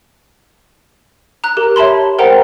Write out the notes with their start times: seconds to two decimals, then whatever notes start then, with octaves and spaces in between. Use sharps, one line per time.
1.44 A#5 F#6
1.57 G4 A#4
1.76 C#5 E5 A5 B5 C6
2.19 A#4 C5 F#5 G5 A#5